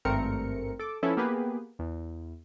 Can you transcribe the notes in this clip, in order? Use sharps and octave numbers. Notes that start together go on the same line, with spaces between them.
G#1 G2 A3 C4 A#4 C#7
A4 D6
F3 B3 C#4 E4 A4
A#3 B3 G4 G#4 B4
E2